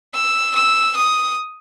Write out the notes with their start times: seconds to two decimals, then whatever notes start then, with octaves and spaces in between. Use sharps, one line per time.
0.14 E6
0.56 E6
0.97 D#6